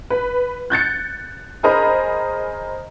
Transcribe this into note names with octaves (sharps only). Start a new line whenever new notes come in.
B4
F#6 G6 A6 C#7
G#4 A#4 C5 D#5 A#5 B5